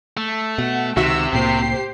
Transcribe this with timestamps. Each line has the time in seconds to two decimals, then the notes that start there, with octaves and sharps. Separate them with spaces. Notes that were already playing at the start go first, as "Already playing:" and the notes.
0.17 A3
0.58 B2 F#5
0.97 C#2 C3 D#3 F#4 E5 E6
1.33 C2 A2 A#3 G4 C5 C7